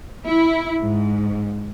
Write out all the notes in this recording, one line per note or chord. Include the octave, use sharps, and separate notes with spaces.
E4
G#2